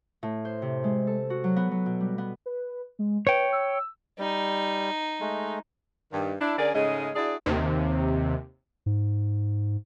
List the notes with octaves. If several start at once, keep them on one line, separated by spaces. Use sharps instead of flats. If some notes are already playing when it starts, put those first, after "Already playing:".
A2
C5
C3
G#3
A4
F#4
F#3
B3
F#3
B2
G3
B3
B4
G#3
B4 C#5 G5
E6
G3 D#4
G#3 A3
G2 D#3
D4 E4
D3 C#4 G#4 A#4 D5
G#2 C#3 G#3 A3 C#4 D#5
D4 E4 F#4 G#4 D5
D#2 C3
G#2